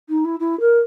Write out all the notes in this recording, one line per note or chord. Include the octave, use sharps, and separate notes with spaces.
D#4
E4
E4
A#4